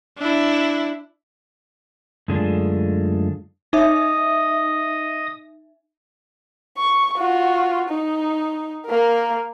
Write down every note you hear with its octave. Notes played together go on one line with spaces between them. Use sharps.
D4 E4
F#2 D3 G#3 A3 D4 F4
D#4 D#5 E5 D#6
C#6
F4 F#4
D#4
A#3 A#4